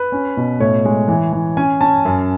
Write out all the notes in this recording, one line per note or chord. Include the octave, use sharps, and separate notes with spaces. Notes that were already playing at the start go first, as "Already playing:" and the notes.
Already playing: B4
C#4
B2
A2 C#5
G#3
E3
E3
C#4 G#5
C#4 A5
F#2